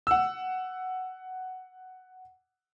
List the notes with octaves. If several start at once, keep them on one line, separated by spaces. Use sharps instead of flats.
F#5 E6